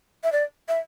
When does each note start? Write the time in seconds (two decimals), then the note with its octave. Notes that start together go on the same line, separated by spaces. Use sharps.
0.24 E5
0.32 D5
0.68 E5